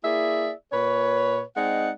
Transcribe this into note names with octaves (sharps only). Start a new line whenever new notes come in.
A#3 E4 G#4 D5 E5
A#2 B4 C#5
G#3 C4 D#4 D5 F#5